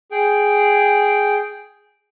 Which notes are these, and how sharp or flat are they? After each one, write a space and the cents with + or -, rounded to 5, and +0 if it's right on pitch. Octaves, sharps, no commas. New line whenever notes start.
G#4 +0 G5 +0